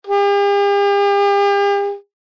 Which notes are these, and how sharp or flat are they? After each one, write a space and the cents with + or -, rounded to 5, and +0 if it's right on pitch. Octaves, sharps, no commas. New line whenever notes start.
G4 +45